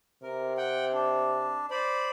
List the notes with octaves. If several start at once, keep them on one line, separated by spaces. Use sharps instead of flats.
C3 A#4
F#5 G5
D4
C5 D5 B5